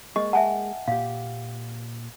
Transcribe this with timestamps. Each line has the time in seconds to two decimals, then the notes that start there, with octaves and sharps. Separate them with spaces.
0.16 G#3 A#3 G#4 D#5 C#6
0.33 E5 F#5 G#5 A5
0.88 A#2 G4 F5